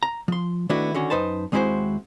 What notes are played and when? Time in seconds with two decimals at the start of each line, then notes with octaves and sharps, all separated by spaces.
0.03 A#5
0.28 F3 C6
0.69 D#3 A3 B3 D4 E4 F#4
0.94 D3 D#3 C#4 F#4
1.10 F#2 D#4 B4 C5 A5
1.52 D#2 G#3 C4 E4 F#4 C5